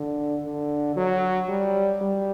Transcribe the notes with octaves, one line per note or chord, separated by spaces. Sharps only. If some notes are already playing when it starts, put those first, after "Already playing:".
Already playing: D3
D3
F#3
G3
G3